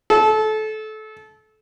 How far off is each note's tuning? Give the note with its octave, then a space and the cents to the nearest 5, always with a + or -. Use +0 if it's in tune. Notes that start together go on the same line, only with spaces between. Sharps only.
A4 -25